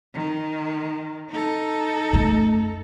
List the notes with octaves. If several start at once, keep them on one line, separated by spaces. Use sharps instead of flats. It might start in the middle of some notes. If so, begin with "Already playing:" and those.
D#3
D#4 A4
F#2 A3